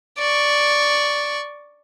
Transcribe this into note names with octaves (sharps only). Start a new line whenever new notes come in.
D5 C#6